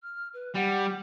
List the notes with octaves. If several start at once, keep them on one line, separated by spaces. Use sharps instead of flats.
F6
B4
G3 F#5